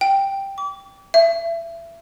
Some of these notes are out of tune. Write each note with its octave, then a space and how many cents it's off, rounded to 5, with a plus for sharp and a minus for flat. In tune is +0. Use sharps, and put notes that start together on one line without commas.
G5 +0
D6 -35
E5 +25